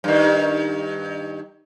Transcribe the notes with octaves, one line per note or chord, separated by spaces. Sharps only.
G2 D#3